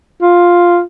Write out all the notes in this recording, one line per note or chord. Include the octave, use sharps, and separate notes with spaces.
F4